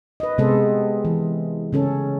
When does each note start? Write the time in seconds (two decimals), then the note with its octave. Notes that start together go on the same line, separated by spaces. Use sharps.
0.20 B4 D#5
0.38 C3 G#3 B3 G#4 A4 C5
1.05 E3
1.73 C#3 C#4 A4